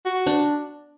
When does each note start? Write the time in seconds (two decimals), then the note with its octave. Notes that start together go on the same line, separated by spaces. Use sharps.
0.06 F#4
0.27 D4